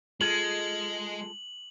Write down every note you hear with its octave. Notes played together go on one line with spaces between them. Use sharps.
G#3 F4 G#4 A4 F#7